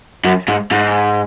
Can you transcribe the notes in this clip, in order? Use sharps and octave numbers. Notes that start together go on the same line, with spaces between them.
F#2
G#2
G#2